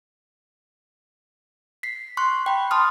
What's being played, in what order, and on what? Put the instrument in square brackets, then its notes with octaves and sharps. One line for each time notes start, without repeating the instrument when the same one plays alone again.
[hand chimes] B6 C7
C6 C#6 F#6
G5 B5
A5 C6 D#6 F6